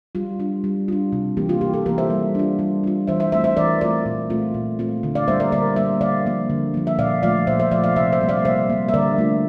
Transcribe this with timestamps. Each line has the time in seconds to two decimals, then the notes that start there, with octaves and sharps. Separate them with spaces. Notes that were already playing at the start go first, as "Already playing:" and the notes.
0.15 G3 F4
0.40 D4 F4
0.64 G3
0.88 D4 F4
1.12 C3
1.37 E3 A#3 G4
1.49 F4
1.61 C3 G4
1.73 F4 A4
1.86 E3 A#3 G4 A#4
1.98 C5 E5
2.10 G3
2.35 D4 F4
2.59 G3
2.84 D4 F4
3.07 E3 C5 E5
3.20 C5 E5
3.32 A3 C4 F4 C5 E5
3.44 C5 E5
3.56 E3 A#4 D5
3.81 A3 C4 F4 A#4 D5
4.06 A#2
4.30 A3 C4 F4
4.54 A#2
4.79 A3 C4 F4
5.03 D3
5.15 D5 F5
5.28 G3 A#3 C5 E5
5.40 A#4 D5
5.52 D3 A#4 D5
5.76 G3 A#3 C5 E5
6.01 D3 D5 F5
6.26 F3 A#3
6.50 D3
6.74 F3 A#3
6.87 E5
6.98 A#2 D5 F5
7.23 F3 A3 D5 F5
7.47 A#2 C5 E5
7.60 C5 E5
7.71 F3 A3 D5 F5
7.84 D5 F5
7.96 C3 C5 E5
8.12 C5 E5
8.21 G3 A#3
8.29 D5 F5
8.45 C3 C5 E5
8.70 G3 A#3
8.88 E5
8.94 D3 A#4 D5
9.18 A3 D4 F4